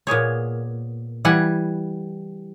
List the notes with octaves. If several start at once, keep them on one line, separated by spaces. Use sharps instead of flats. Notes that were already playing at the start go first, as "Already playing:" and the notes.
A#2 B3 G#4 C#5
E3 G3 F#5 G#5